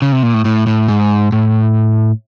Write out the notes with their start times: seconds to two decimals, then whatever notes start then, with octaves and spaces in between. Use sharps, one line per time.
0.02 C#3
0.12 C3
0.23 A#2
0.34 A2
0.45 A2
0.67 A2
0.88 G#2
1.32 A2